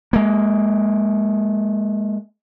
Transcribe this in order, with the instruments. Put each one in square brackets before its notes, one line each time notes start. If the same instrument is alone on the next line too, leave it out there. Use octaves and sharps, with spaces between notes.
[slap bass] G#3 A#3